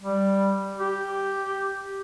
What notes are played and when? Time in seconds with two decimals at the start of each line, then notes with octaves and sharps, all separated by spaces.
0.02 G3
0.80 G4